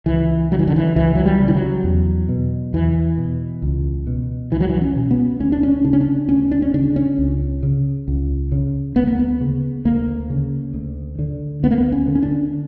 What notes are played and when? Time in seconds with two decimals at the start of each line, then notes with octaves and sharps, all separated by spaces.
0.06 C#2 E3
0.51 C#3 F#3
0.59 E3
0.67 D3
0.76 E3
0.96 C#2 E3
1.15 F#3
1.25 G3
1.40 C#3
1.48 E3
1.55 F#3
1.84 E2
2.29 B2
2.73 E2 E3
3.18 B2
3.62 C#2
4.07 B2
4.51 C#2 E3
4.60 F#3
4.69 E3
4.82 C#4
4.96 B2
5.11 B3
5.40 D2 C#4
5.52 D4
5.63 C#4
5.85 C#3 D4
5.93 C#4
6.01 D4
6.29 D2 C#4
6.51 D4
6.62 C#4
6.74 C#3 D4
6.96 C#4
7.18 C#2
7.63 C#3
8.08 C#2
8.52 C#3
8.96 D2 B3
9.07 A#3
9.19 B3
9.41 C#3
9.85 D2 A#3
10.30 C#3
10.74 D2
11.19 D3
11.63 D2 B3
11.71 A#3
11.78 B3
11.92 C#4
12.08 D3
12.15 C#4
12.23 D4